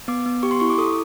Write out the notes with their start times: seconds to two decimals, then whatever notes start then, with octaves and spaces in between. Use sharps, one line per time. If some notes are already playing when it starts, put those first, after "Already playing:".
0.08 B3 D6
0.26 B3
0.43 G4 C#6
0.51 C6
0.60 E4 C#6
0.70 D6
0.78 A4 D#6